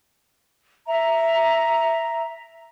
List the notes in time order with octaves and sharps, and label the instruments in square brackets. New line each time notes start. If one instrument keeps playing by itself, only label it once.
[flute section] E5 A#5